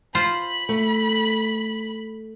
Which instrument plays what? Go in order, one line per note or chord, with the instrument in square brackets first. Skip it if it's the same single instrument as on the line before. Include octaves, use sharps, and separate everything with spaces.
[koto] F4 C5 [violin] B5
[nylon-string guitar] A3